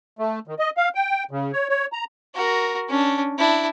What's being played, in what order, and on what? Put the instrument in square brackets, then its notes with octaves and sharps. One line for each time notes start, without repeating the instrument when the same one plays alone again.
[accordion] A3
D#3
D#5
F5
G5
C#3
C#5
C#5
A#5
[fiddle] F#4 A#4
C#4 D4
D4 E4